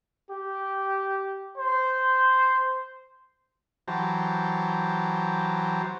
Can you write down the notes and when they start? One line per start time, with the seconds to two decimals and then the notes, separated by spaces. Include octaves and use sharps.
0.30 G4
1.57 C5
3.88 E3 F#3 G4 C5 A5 A#5